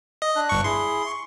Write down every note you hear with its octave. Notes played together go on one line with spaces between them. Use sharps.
D#5
D4 F#6
G1 G2 C#6
E4 G#4 C6
C#6